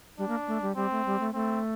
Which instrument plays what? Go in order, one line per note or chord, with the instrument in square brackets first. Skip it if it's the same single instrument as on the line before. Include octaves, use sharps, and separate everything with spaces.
[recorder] G3 [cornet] D4
[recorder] A#3
A3
G3
[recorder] G3 [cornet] C4
[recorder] A3
G3
A3
[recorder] A3 [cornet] C4